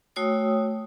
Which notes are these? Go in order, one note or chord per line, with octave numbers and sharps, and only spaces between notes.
A3 F#4 C#5 G5 D#6 E6